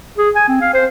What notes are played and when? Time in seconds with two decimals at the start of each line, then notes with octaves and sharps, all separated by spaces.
0.18 G#4
0.35 G#5
0.48 C4
0.61 F5
0.73 C5